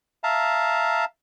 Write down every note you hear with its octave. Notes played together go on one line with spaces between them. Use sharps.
E5 F5 A5 A#5